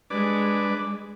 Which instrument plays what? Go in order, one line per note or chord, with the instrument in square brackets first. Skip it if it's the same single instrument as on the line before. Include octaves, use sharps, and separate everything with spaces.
[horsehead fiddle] G#3 [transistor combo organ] D4 B4 D5